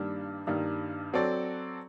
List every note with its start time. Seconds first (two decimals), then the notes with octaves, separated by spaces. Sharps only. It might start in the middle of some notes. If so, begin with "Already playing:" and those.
Already playing: G2 D#3 G3 A#3 D4
0.47 G2 D#3 G3 A#3 D4
1.13 F#3 C4 F#4 A4 D5